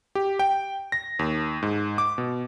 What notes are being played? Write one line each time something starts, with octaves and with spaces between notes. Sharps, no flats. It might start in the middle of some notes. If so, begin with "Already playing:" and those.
G4
G5
A#6
D#2
G#2
D6
B2